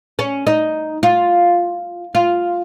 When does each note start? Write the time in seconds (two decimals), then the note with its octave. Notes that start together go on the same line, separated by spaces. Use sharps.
0.19 C#4
0.47 D#4
1.03 F4
2.15 F4